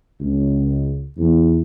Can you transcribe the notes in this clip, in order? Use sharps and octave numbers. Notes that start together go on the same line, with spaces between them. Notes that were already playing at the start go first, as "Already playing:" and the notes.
C#2
E2